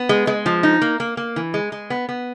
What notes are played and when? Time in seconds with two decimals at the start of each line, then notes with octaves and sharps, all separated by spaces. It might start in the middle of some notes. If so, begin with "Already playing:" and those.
Already playing: B3
0.09 G#3
0.27 G#3
0.46 F3
0.63 D#4
0.82 A#3
1.00 A#3
1.17 A#3
1.36 E3
1.54 G#3
1.72 G#3
1.90 B3
2.09 B3